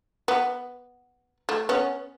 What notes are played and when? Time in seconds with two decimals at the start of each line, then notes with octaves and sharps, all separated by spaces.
0.28 B3
1.49 A3
1.69 B3 C#4